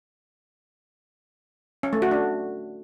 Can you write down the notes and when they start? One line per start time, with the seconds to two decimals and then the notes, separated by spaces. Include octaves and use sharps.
1.83 C#4
1.93 A3
2.02 F#4
2.11 D4